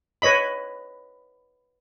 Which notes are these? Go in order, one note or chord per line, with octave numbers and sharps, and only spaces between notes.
B4 C#5 D#5 B5